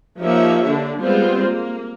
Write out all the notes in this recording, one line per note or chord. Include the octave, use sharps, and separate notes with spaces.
F3 A#3 D#4 G4 C#5 E5
D3 D4
G3 G#3 B3 C4 F4 C5
A#3